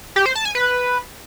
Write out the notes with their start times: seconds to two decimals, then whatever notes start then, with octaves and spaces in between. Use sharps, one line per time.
0.16 G4
0.26 C5
0.35 A5
0.45 G#5
0.55 B4